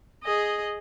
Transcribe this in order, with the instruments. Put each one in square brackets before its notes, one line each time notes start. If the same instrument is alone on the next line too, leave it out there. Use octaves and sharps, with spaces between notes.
[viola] G#4 D#5